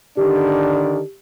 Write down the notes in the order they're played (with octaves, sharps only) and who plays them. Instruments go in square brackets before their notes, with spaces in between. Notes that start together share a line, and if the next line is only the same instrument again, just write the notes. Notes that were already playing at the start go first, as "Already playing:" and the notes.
[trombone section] D3 D#3 D4 [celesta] G4